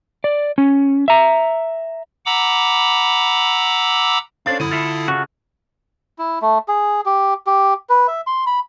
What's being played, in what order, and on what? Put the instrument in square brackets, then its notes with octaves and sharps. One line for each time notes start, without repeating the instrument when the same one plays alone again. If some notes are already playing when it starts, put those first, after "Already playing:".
[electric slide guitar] D5
C#4
E5 A#5
[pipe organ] F#5 A#5 B5 D6 E6
[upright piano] C#4 A4 C5 [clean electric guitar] D4 D5 [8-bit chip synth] F5
[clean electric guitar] B1 F#2 [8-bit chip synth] D3 E4 D#6 [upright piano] B5 D#7
[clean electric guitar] F4 A4 E5
[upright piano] C#3 [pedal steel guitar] F#4
[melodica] E4
A3
G#4
G4
G4
B4
E5
C6
B5